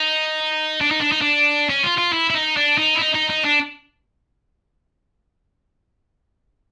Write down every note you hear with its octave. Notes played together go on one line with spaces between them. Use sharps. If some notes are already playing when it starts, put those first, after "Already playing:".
Already playing: D#4
D4
D#4
D4
D#4
D4
C#4
F4
F4
E4
E4
D#4
D4
D#4
E4
D#4
D#4
D#4
D4